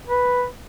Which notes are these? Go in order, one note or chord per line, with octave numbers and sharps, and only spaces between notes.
B4